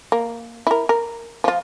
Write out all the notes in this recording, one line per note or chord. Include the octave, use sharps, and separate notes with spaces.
A#3
E4 A#4
A#4
F3 F4